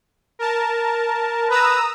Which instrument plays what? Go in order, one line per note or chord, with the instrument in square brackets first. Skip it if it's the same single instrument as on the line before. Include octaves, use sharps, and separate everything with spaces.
[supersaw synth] A#4 A5
[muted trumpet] B4 [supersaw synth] A#5 D#6 E6